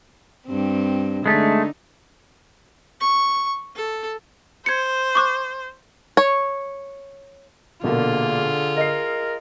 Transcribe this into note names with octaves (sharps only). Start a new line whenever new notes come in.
G2 C4
D3 G#3 A3 D#4
C#6
A4
C5 G#6 C#7
C#6 D6 F#6
C#5
A#1 B2 D3 A#3 F4 G#4 A#4
A#4 D#5 C7